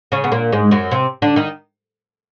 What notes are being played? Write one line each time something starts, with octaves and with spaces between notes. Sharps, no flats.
C#3 C#4
B3
A#2 A#3
G#2 G#3
F#2 F#3
C3 C4
D3 D4
D#3 D#4